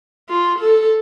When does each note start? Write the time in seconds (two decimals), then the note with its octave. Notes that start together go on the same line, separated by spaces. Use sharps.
0.29 F4
0.59 A4